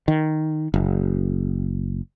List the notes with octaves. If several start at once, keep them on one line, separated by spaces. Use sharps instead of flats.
D#3
F#1